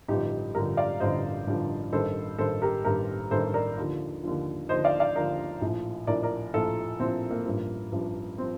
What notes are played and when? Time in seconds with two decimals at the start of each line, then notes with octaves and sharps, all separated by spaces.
0.08 A1 G2 D3 F3 D#4 G4
0.54 A1 G2 D3 F3 G4 A#4
0.77 D5 F5
1.00 A1 G2 D3 F3 C5 D#5
1.47 A1 G2 D3 F3
1.92 A1 G2 D#3 A4 C5
2.38 A1 G2 D#3 A4 C5
2.62 G4 A#4
2.85 A1 G2 D#3 G4 A#4
3.31 A1 G2 D#3 A4 C5
3.54 A#4 D5
3.77 D#2 D3 F3
4.23 D#2 D3 F3
4.69 D#2 D3 F3 C5 D#5
4.84 D5 F5
5.00 D5 F5
5.15 D#2 D3 F3 A#4 D5
5.61 A#1 A2 F3
6.07 A#1 A2 F3 A#4 D5
6.23 A#4 D5
6.54 A#1 A2 F3 F4 A4
7.00 A#1 A2 F3 C4
7.31 A#3
7.46 A1 G2 F3
7.92 A1 G2 F3
8.38 F3 C4